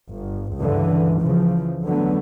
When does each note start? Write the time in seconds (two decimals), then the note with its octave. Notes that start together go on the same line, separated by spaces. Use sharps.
0.11 G1
0.58 C#2 G2 D3 E3
1.22 C#3 E3 F3
1.85 D3 F#3 A3 B3